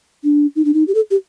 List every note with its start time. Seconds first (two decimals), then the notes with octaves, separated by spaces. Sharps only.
0.24 D4
0.56 D#4
0.65 D4
0.74 D#4
0.88 G4
0.95 A4
1.11 G4